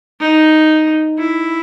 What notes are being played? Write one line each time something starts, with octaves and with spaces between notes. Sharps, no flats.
D#4
E4